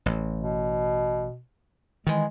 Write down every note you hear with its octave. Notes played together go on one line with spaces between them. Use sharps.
A1
B2
D#3 E3 G#3